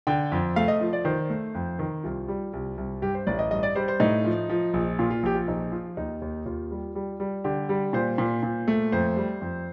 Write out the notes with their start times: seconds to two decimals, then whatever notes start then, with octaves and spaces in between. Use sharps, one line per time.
0.07 D3 G5
0.32 F2
0.56 A3 F5
0.68 D#5
0.81 F3
0.93 D5
1.05 D#3 C5
1.30 A3
1.55 F2
1.79 D#3
2.04 C2 F4
2.28 G3
2.53 C2
2.77 C2
3.02 G2 G4
3.15 C5
3.27 A1 D5
3.39 D#5
3.51 G2 D#5
3.63 D5
3.75 G3 C5
3.88 C5
4.00 A2 D#4
4.25 F3
4.49 F3
4.74 A#1
4.99 A#2 F4
5.10 F4
5.23 A#1 G4
5.35 F4
5.48 A#1 D#4
5.72 F3 F4
5.97 D#2 D#4
6.22 D#2
6.46 D#2 F4
6.71 G3
6.95 G3
7.20 G3
7.44 D3 G4
7.69 G3
7.93 A#2 C5
8.18 A#2
8.43 A#2
8.68 A3
8.92 F2 C5
9.17 G3
9.41 F2